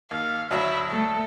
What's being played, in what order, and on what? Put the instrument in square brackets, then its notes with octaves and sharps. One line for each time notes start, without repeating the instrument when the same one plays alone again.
[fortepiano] D#2 [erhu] F5
[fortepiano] D2 F#3 E5 [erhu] E4
[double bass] A3 [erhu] A4